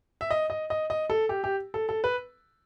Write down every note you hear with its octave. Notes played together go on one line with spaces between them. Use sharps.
E5
D#5
D#5
D#5
D#5
A4
G4
G4
A4
A4
B4